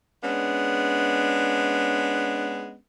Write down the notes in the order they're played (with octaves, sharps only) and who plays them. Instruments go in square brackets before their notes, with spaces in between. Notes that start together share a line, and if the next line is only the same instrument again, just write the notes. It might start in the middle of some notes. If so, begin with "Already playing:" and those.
[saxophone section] G#3 B3 C#4 D4